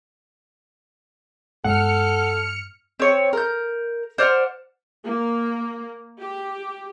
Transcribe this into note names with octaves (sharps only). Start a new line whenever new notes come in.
G2 G#3 B3 A4 F#5 F6 C#7
C4 C#5
A#4 G6
C5 D5 F#5 F6
A#3
G4